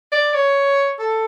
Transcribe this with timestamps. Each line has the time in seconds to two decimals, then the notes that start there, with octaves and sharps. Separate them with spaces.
0.12 D5
0.34 C#5
0.99 A4